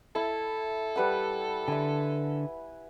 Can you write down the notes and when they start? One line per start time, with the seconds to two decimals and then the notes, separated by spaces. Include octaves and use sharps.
0.15 E4 A4
0.96 G3 B4 F#5
1.68 D3 E5 G#5